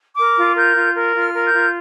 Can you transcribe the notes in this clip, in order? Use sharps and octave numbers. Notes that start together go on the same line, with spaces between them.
A#4 D6
F4
A#4 G6
F4
A#4
F4
F6
A#4
G6
F4